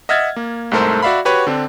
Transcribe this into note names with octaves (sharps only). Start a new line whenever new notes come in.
D#5 E5 F#5 F6 G#6 A6
A#3
C2 G#2 A3 A4 A#4 C5
F#4 D5 E5 F5 B5
F#4 G4 B4 C#5 F#5
D3 C4 D4